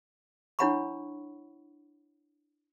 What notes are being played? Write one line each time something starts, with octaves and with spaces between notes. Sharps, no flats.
D4 E4 C#5 F#5 B5 C#6